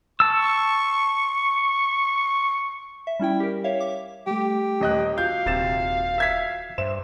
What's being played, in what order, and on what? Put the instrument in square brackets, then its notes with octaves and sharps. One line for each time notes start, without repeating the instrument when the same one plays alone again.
[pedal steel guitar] A5 E6 [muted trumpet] C#6
[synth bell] E5
G3 C#4 E4 G5
G4 A#4
C#5 E5 F5
D6
[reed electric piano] G3 A3 [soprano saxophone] G4
[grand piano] D#1 D#5 F#6
[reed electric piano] F4 F#4 [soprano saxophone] F5 [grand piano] G6
[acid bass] D#1 [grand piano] C3 A6 E7
[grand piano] E5 G#6 B6
[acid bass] G2 [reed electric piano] C5 E5 [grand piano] E7